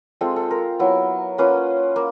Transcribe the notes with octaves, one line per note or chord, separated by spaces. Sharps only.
G#3 C4 F4 A4
A4
A#4
F#3 B3 E4
A#3 C#4 F4 B4
A#3